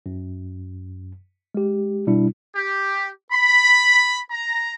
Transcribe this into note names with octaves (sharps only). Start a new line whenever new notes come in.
F#2
G#3 G4
B2 G3 D4 E4
G4
B5
A#5